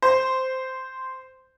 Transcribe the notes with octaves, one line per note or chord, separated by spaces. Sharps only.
C5